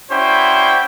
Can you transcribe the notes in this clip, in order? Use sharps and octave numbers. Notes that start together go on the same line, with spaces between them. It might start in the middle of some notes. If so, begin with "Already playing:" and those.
C#4 E4 F#4 C5 D5 G5